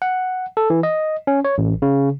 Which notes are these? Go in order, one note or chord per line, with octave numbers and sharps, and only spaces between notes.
F#5
A4
E3
D#5
C#4
C#5
A1
C#3